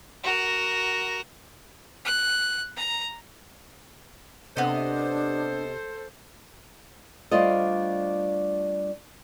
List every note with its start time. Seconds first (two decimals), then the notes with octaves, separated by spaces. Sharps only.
0.23 F#4 A#4
2.05 F#6
2.76 A#5
4.57 C3 B3 D4 A4 C5 D#5
7.31 G3 A3 D4 F4 C5 D#5